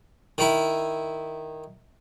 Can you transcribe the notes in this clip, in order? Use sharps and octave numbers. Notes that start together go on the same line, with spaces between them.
D#3 E4